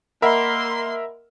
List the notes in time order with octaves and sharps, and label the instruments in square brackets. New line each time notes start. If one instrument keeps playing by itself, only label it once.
[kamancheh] A#3 C6 [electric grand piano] A#4 E5 [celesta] D#5 F#5 B5